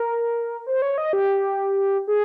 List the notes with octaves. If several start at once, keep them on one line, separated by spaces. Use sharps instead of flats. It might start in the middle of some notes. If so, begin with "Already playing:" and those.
Already playing: A#4
C5
C#5
D#5
G4
G#4